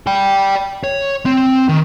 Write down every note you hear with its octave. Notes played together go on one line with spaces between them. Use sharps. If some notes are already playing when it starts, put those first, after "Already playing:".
D5 G5
C#5
C4
D#3